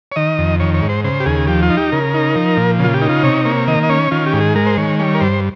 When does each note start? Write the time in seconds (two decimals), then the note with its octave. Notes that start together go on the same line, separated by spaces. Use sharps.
0.12 C#5
0.16 D#3 D#5
0.39 F2
0.60 D#3 C#5
0.74 C#5
0.82 G#2
0.89 C5
1.04 C#3 C5
1.20 G4
1.26 D#2 G#4
1.47 F3 G4
1.63 F4
1.70 D#4
1.77 G4
1.92 C#3 A#4
2.14 D#4
2.35 F3
2.57 A#2
2.79 C#3
2.84 F4
2.94 G4
3.02 D#4
3.09 F4
3.23 C3 C#5
3.45 A#3 C#5
3.67 D#3 D#5
3.83 D#5
3.89 C#4 C#5
4.11 D#3 F4
4.26 G4
4.33 G#2
4.41 G#4
4.56 G#3 A#4
4.66 C5
4.77 D#3 C#5
4.99 G3 C#5
5.14 A#4
5.21 G2 C5